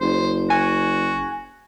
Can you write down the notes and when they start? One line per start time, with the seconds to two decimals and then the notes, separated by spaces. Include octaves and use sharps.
0.01 F#1 C5
0.50 F#4 G#5